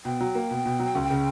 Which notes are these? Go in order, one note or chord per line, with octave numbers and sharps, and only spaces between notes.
B2 G5
F#3
A#3
B2
B2
F#3
C#2
C#3